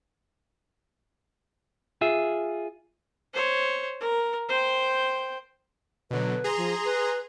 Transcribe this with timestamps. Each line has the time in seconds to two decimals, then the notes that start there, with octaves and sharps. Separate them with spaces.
2.01 F4 G#4 E5
3.34 C5 C#5
4.00 A#4
4.49 C5 G5
6.11 B2 D3 F#3 B4
6.44 G#4 A#5 C6
6.57 F3
6.85 B4